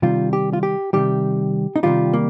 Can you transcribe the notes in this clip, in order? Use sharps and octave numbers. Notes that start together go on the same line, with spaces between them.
C3 D#3 G3 F4
G4
F4
G4
C3 D#3 G3 G4
D#4
C3 D#3 G3 F4
A#3